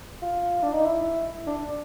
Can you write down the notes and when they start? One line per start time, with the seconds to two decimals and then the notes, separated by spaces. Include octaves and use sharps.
0.22 F4
0.63 D4
0.73 D#4
0.85 E4
1.47 D4